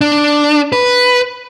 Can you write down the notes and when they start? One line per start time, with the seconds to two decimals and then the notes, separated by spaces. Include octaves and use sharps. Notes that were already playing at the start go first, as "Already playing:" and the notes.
0.01 D4
0.73 B4